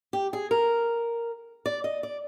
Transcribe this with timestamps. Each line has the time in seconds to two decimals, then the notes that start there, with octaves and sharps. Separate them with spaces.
0.13 G4
0.33 G#4
0.51 A#4
1.66 D5
1.84 D#5
2.03 D5